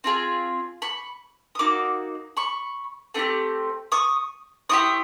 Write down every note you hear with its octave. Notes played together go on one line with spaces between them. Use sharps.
C4 F4 G#4
B5 C#6
D#6
A#3 D#4 F#4 D6
B5 C#6
A3 C4 D#4 G4
C#6 D#6
C4 E4 G4 C#6 D#6